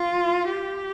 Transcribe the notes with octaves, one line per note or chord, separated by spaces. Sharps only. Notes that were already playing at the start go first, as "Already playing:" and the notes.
Already playing: F4
G4